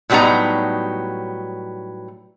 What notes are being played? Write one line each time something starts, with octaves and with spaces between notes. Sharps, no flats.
A2 F#3 G3 B3 D#4 A#5